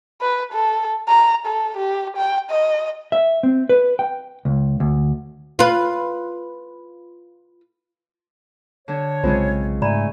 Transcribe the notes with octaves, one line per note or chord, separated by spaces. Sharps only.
B4
A4
A#5
A4
G4
G5
D#5
E5
C4
B4
G5
C#2
D2
F4 B4
D3 D4 C#5
B1 C#3 G#3 C4 F4 C5
G#2 A3 D5 G#5 A#5 B5